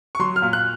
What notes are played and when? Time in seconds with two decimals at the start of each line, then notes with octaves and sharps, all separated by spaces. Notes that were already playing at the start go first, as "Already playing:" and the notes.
0.15 C#6
0.19 F#3 C6
0.36 F6
0.42 A#2
0.53 F#6